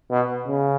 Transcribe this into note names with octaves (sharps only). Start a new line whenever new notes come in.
B2
C#3